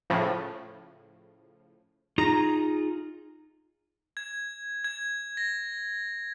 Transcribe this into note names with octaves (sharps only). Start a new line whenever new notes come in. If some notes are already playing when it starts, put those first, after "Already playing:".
A2 C#3 F3
D#4 F4 G#4 A#5
G#6
G#6
A#6